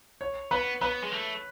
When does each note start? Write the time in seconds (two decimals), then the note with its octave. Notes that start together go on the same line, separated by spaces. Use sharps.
0.21 C#5
0.51 B3 B4
0.81 B3 B4
1.02 G#3
1.12 A3